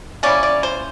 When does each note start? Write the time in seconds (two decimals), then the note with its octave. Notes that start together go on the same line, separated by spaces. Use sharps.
0.23 E3 G3 A#3 C#4 D5
0.43 D5
0.63 C5